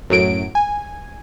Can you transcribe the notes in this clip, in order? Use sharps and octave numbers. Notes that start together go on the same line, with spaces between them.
F#2 A2 F#3 D7
G#5